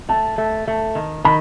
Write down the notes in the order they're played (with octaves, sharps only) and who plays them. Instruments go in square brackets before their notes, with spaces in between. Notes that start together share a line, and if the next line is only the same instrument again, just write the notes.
[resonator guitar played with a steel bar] A3 [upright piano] A5
[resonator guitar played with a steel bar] A3
A3
D#3
[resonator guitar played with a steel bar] D#3 [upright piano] B5